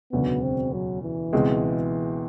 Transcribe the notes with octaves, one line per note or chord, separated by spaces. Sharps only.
E1 D2 C#3 F#3 B3
C4
F#3
E3
C#2 B2 G#3 C4